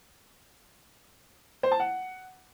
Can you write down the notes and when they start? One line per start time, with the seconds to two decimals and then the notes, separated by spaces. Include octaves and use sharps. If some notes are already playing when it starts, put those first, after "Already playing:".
1.63 C5
1.71 A5
1.80 F#5